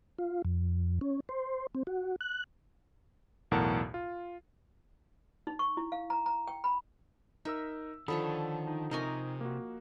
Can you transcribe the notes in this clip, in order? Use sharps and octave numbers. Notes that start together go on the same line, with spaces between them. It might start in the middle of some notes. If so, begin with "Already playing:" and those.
F4
F2
C#4
C5
C4
F#4
F#6
B1 E2 A2 A#4 F#5 A5
F4
D#4
C#6
E4
F5
A#5
A#5
G5
B5
D#4 A#4 E5 E6
D3 D#3 F3 A4 C#5 B5 D#6
D#4
C3 D#4 A#4 D#5 G#5 C#6
A#3 F#4